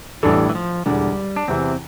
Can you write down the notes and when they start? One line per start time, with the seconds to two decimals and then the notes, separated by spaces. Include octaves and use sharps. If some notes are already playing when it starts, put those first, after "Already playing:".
0.23 A1 A2 E3 G3 D4 A4
0.49 E3
0.55 F3
0.86 E1 E2 D3 G3
1.36 D4
1.48 E2 C3 E3 C4